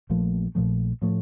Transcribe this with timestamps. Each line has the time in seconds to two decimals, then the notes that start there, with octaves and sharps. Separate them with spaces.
0.10 A#1 A#2 F3 A3
0.55 A#1 A#2 F3 A3
1.02 A2 F3 A3